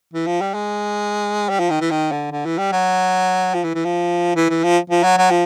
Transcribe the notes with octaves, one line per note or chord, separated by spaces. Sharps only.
E3
F3
G3
G#3
G3
F3
D#3
E3
D#3
D3
D3
E3
G3
F#3
F3
E3
E3
F3
E3
E3
F3
F3
F#3
F#3
F3